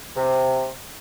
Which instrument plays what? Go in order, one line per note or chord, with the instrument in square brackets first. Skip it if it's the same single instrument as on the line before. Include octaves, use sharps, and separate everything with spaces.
[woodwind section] C3